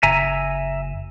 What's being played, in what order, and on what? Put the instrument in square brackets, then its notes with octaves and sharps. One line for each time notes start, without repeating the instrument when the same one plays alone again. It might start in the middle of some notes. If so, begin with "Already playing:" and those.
[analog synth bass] F#1 [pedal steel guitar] E5 G#5 A#5